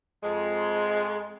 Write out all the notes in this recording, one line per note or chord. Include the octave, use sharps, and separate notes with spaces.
F2 G#3